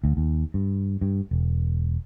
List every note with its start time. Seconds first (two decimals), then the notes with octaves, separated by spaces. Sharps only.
0.04 D2
0.17 D#2
0.54 G2
1.01 G2
1.31 E1